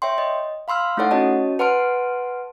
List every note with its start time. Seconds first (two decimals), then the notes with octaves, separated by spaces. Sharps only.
0.02 C#5 E5 G5 C6
0.18 D#5
0.68 F5 B5 C6 E6 F6
0.97 A3 D#4 E4 A4 C#5 F#5
1.11 C#4 F#4 C#5 D#5 A5
1.59 B4 F#5 A5 C6 F6 D7